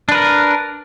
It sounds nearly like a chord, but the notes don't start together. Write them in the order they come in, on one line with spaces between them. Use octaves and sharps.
D4 B4 A#4